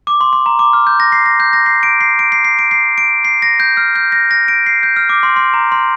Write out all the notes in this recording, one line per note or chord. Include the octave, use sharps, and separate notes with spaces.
D6
C6
C6
A#5
D6
F6
G6
A#6
C7
A#6
G6
A#6
C7
D7
C7
D7
C7
C7
D7
C7
D7
C7
A#6
G6
F6
G6
A#6
A#6
D7
C7
G6
F6
D6
C6
C6
A#5
C6